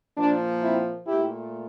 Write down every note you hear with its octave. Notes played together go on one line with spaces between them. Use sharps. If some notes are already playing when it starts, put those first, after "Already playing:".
A#2 F3 A#3 D4
C4 E4
A#2 A3 E4 G4